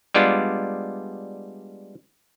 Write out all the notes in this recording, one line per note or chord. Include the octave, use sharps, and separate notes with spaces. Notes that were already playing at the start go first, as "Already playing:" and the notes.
G3 G#3 B3 D4 F4